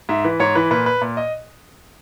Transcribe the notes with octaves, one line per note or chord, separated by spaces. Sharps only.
G#2 E5
E3 B4
G#2 C#5
E3 B4
A#2 B4
B4
A#2
D#5